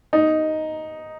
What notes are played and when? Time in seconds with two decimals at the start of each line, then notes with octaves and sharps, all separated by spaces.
0.13 D#4